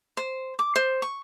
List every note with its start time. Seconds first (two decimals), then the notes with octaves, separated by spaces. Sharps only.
0.17 C5
0.59 D6
0.76 C5
1.02 C#6